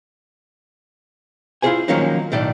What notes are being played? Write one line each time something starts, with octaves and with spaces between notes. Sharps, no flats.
E4 F4 G4 G#4 C5 G#5
D#3 F3 F#3 A#3 C#4 D#4
B1 A2 D#3 D5 D#5